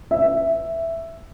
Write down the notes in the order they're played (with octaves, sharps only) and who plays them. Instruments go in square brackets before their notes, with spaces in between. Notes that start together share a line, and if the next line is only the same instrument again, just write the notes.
[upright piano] E5